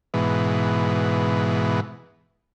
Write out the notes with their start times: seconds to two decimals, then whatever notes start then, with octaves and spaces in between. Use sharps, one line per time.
0.14 G#2 B2 E3